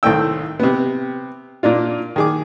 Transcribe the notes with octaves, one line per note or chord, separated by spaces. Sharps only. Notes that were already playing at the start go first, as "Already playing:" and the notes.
C2 A2 D#3 A3 G5 E6
C3 B3
A#2 A#3 D4 F4
D#3 G#4 D6